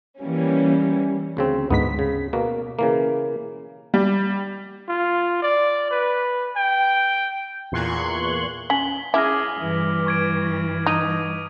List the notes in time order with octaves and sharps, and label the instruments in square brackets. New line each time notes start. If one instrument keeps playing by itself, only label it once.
[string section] E3 G3 A#3 C#4
[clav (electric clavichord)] D2 C#3 C4
[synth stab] D2 G#2 B6 [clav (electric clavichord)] B3
[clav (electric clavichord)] C#3
[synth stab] B2 [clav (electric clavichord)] A#3
[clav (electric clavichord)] C#3 E3 A#3
[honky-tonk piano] G3
[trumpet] F4
D5
B4
G5
[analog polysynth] E2 A#2 C6 C#6 F#6 G#6
[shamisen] C#4 [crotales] B6 F#7 G7
[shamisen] C#4 E4 E5 [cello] G#4 [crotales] D6 F6 A#6
[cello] G2 E3
[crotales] C#6 G#6 D7
[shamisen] D#4 [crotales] D#6 D#7